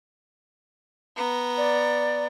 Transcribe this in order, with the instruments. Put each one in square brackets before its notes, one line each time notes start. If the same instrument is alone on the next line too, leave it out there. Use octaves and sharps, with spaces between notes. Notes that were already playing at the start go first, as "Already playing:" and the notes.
[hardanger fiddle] B3 A#5
[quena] D5